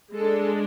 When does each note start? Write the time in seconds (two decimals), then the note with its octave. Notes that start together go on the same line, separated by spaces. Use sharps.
0.15 G#3 D4 A4